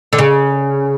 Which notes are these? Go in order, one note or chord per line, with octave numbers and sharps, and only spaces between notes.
D3
C#3